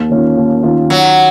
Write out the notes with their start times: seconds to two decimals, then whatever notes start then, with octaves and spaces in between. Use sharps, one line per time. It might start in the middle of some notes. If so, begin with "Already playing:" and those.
Already playing: D#2
0.09 D#3 A#3 C#4 F4
0.37 D#2
0.63 D#3 A#3 C#4 F4
0.90 D#3 F#3